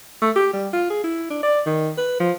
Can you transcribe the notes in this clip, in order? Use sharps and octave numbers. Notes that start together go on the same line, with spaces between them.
A3
G4
G3
F4
G#4
E4
D4
D5
D#3
B4
F3